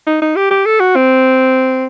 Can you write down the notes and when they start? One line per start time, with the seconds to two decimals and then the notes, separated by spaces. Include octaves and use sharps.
0.07 D#4
0.22 D#4
0.36 G4
0.51 G4
0.66 A4
0.80 F#4
0.96 C4